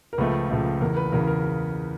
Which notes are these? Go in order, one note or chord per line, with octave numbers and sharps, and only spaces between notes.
A#4
C#2 C#3 F3 A3 B4
C#2 C#3 F3 A3
E2 C#3 E3 A#4
B4
E2 C#3 E3 A#4
A#4